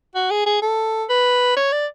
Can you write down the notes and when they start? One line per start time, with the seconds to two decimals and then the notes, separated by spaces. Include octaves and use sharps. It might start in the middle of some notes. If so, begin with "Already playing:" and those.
0.15 F#4
0.30 G#4
0.46 G#4
0.62 A4
1.09 B4
1.56 C#5
1.72 D5